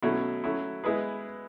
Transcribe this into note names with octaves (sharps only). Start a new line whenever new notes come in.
B2 F#3 A3 C#4 E4
F#3 A3 C#4 E4
G#3 B3 E4 G#4 B4